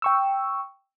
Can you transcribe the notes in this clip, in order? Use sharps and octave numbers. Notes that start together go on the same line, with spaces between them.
G5 C#6 E6